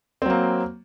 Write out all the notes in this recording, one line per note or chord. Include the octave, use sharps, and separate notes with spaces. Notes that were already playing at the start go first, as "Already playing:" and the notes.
F#3 A#3 C4